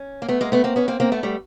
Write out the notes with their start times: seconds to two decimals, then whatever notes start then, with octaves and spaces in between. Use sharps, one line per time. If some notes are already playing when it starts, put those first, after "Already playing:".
Already playing: C#4
0.22 A#3
0.28 A3 B3
0.41 G#3 A#3
0.52 A3 B3
0.64 A#3 C4
0.76 B3 C#4
0.88 A#3 C4
1.00 A#3 C4
1.12 A3 B3
1.23 G3 A3